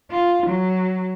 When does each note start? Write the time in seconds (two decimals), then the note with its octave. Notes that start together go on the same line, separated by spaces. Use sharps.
0.11 F4
0.47 F#3